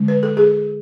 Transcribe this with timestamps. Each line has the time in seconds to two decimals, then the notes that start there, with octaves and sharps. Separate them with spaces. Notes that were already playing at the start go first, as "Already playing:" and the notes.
Already playing: D3 G#3
0.08 B4
0.23 A4
0.37 G#4